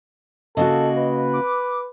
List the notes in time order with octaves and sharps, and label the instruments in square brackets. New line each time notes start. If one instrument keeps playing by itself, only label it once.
[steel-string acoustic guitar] C#3 A#3 F#4 [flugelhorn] A4 [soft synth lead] D#5
[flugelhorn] B4
[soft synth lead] D6